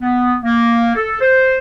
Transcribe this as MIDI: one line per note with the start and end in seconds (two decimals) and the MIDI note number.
0.01 0.35 59
0.43 0.93 58
0.95 1.18 69
1.21 1.58 72